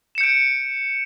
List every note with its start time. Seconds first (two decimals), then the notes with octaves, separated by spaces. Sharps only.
0.15 E7
0.18 C#7
0.21 G6
0.23 D7